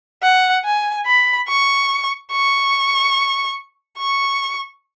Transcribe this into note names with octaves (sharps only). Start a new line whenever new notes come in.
F#5
G#5
B5
C#6
C#6
C#6